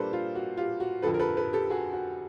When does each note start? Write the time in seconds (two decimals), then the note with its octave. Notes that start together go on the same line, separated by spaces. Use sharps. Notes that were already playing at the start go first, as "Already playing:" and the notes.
Already playing: A#2 G3 A#3 D4 A4 B4 C5
0.13 F4
0.35 F#4
0.57 F4 G4
0.80 F#4
1.02 F2 D3 F3 A4 B4
1.14 A#4
1.19 A4 B4
1.37 A4 B4
1.53 G4 A4
1.70 F#4 G#4
1.93 F#4